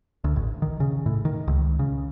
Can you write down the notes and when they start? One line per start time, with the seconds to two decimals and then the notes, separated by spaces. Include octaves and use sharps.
0.24 D2
0.36 A1
0.62 D#3
0.80 C#3
1.06 A2
1.25 D#3
1.48 C#2
1.79 C#3